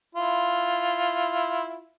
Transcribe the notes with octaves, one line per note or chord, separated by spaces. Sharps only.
E4 F4